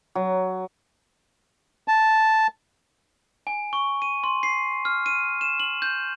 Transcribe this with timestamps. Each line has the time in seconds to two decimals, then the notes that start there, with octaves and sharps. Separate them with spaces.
0.15 F#3
1.88 A5
3.47 G#5
3.73 C#6
4.02 D#7
4.24 C6
4.43 C7
4.85 F6
5.06 D#7
5.41 E7
5.60 F#7
5.82 G6